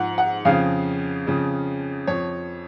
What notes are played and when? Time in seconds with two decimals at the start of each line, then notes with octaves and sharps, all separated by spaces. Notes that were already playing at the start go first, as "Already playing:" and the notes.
Already playing: G#2 F3 F#5
0.18 F#5
0.45 F2 C#3 F3 F5
1.26 F2 C#3 F3
2.07 F2 F3 C#5